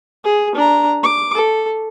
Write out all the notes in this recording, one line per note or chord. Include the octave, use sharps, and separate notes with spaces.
G#4
D4 A#5
D6
A4